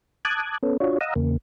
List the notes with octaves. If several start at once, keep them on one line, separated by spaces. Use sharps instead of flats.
A5 D6 D#6 F#6 G#6
B3 C#4 A4
D4 F4 F#4 C#5
D#5 F5 F#5 A#5 D#6 E6
E2 C#3 A#3